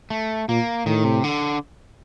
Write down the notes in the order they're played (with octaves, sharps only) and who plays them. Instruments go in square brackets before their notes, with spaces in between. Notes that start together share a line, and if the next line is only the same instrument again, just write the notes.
[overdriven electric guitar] A3
[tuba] A#2 [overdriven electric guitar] A#3
[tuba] A2 [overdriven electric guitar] D#3
[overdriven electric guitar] C3
D3